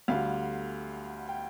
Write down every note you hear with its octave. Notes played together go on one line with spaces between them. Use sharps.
D2 D3 G3 F5
G5